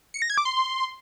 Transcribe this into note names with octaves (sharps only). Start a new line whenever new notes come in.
C#7
A#6
G#6
D6
C6